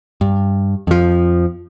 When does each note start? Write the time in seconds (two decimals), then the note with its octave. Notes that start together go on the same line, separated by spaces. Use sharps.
0.21 G2
0.87 F2 F3